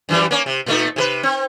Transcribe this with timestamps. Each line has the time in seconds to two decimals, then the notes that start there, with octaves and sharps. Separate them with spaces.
0.09 F#2 E3 G3
0.31 A#3 C#4
0.46 C3
0.66 A#2 A3 D#4
0.96 C3 G#4 B4
1.23 C4